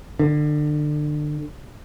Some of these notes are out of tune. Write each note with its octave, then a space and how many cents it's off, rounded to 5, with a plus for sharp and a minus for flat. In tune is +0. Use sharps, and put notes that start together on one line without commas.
D3 +30